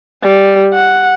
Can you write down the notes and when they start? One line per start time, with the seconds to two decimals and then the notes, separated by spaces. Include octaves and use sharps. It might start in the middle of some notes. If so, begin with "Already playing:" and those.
0.23 G3
0.73 F#5